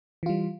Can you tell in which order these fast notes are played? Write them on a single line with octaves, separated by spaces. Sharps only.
E3 F4 G3